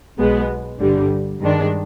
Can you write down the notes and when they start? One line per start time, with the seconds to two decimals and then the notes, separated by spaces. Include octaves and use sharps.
0.18 B1 B2 G#3 B3
0.79 G1 G2 D3 G3
1.40 G2 D#3 G#3 D4